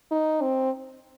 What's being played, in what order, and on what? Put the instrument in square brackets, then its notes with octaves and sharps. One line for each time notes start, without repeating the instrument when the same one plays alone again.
[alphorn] D#4
C4